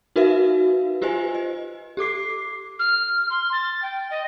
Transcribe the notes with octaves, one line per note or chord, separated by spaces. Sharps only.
D#4 F#4 A#4 B4 E5 F5
F4 G4 B4 C5 D#5 G#5
D#5
G4 A4 D6 C7
F6
C6
A6
G5
D#5